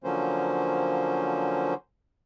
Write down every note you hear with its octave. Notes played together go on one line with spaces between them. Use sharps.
D3 F3 F#3 A#3 C#4 C5